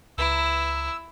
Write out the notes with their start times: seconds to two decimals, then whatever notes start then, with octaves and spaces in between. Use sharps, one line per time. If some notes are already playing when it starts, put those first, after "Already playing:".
0.18 C#2 E4 B4 A#5 E6